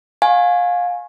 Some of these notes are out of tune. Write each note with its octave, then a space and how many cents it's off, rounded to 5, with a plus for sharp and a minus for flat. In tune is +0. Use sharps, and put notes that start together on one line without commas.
F5 +25 G#5 +5 C#6 -35